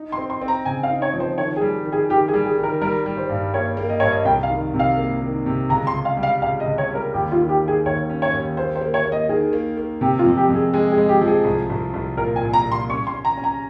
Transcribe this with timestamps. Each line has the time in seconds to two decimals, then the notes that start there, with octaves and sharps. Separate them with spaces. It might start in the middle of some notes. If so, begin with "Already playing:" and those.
Already playing: D#4
0.12 C6
0.18 C4
0.30 C6
0.42 C4
0.48 A#5
0.65 C#3 G#5
0.83 F5
0.90 D#4
1.02 C#5
1.14 F3
1.20 C5
1.38 D#3 C#5
1.56 G#4
1.62 G3
1.85 D#3
1.92 G#4
2.09 D#3 G4
2.28 G#4
2.34 G3
2.46 G#4
2.58 D#3
2.63 A#4
2.81 G3 A#4
3.06 G3
3.17 C5
3.29 G2
3.54 A#3 C#5
3.77 A#3
3.89 D#5
4.00 G2 C#5
4.11 D#5
4.25 C2 G5
4.43 F5
4.50 D#3
4.74 C3
4.79 F5
4.97 A#3
5.21 D#3
5.46 C3
5.69 C#2 A#5
5.87 C6
5.94 C#2
6.05 F5
6.17 G3
6.23 F5
6.42 C#2 F5
6.60 D#5
6.66 C#2
6.78 C#5
6.90 G3 A#4
7.14 D#2 G4
7.32 F4
7.37 D#3
7.49 G4
7.62 D#3
7.68 G#4
7.86 D#2 C#5
8.10 C#4
8.22 C#5
8.34 D#2
8.57 A#3 C5
8.76 C5
8.81 A#3
8.94 C#5
9.05 A#3
9.12 D#5
9.29 D#3 G#4
9.53 A#3
9.78 A#3
10.01 C3 G4
10.19 F4
10.25 F2
10.37 G4
10.49 F2
10.55 G#4
10.74 G#3 G#4
10.92 G#4
10.98 G#3
11.09 G4
11.21 F3
11.28 G#4
11.45 C2
11.70 C2
11.94 C2
12.17 A#2 A#4
12.36 G#5
12.41 A#2
12.53 A#5
12.66 A#2
12.72 C6
12.89 C#4 C#6
13.07 C6
13.13 C#4
13.25 A#5
13.37 C#4
13.44 A#5